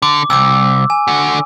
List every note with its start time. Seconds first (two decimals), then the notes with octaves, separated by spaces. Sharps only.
0.02 D3 D6
0.30 C2 D6 E6
0.90 G#5
1.08 D3 F#4